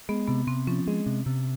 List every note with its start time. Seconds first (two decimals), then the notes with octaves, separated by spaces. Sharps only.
0.09 G#3 B3
0.27 C3 B3
0.47 C3 C4
0.67 F3 C#4
0.88 G#3
1.06 C3
1.26 C3